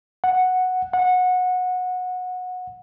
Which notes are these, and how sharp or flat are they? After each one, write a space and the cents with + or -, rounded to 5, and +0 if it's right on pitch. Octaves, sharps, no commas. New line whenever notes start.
F#5 -5
F#5 -20